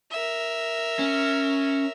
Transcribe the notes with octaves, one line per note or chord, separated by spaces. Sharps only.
A#4 E5
C#4